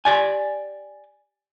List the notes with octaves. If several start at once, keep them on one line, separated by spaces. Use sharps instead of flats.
G4 D5 G#5